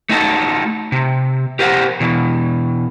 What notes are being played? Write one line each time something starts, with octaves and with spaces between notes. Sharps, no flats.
A3 D#4 F#4 A4
C3
G4 A#4 C5 F5 F#5
B2 E3